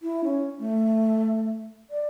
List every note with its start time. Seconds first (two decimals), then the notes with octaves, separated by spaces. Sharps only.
0.02 E4
0.24 C#4
0.59 A3
1.90 D5